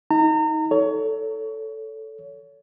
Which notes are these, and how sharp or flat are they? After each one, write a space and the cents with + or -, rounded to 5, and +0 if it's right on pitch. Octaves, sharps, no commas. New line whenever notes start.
D#4 +25 A#5 -35
A4 +0 C#5 +25